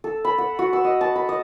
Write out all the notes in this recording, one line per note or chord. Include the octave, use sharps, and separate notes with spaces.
A4
B5
F#5
F#4
E6
D#5
A5
B5
D#5